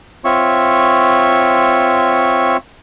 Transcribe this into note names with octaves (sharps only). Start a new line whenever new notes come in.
C4 F4 C#5 E5 C#6